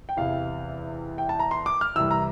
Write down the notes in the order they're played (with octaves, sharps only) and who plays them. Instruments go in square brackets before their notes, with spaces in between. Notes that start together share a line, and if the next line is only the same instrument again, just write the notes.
[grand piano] G5
E2 C3 E3 F5
G5
A5
A#5
C6
D6
F6
C2 C3 E3 E6
A#5